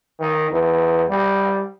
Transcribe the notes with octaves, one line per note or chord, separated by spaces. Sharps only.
D#3
E2
G3